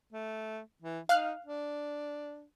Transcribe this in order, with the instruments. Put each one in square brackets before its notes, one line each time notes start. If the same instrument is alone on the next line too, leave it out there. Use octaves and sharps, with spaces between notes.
[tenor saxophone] A3
E3
[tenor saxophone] D#4 [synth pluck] F5 F6 F#6
[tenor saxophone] D4